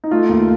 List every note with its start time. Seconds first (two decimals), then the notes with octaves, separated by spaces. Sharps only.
0.04 D#4
0.11 A3 F4
0.29 D#2 F4